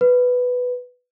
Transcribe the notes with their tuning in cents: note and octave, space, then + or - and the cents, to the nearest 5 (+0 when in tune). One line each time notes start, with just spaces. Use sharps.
B4 +5